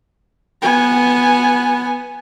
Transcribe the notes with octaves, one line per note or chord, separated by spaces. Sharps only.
B3 G#5